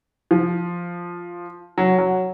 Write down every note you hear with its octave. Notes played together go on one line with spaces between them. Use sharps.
F3
F#3
F#3